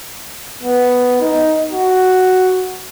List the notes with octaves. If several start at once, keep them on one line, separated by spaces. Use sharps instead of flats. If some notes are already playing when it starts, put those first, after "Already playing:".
B3
D#4
F#4